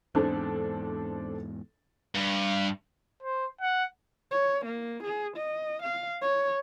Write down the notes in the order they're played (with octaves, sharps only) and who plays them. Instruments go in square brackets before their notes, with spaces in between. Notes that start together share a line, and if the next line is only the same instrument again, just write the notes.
[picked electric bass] E2 G#2 [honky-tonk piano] C4 D4 A4
[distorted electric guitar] G2
[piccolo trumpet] C5
F#5
[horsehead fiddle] C#5
A#3
G#4
D#5
F5
C#5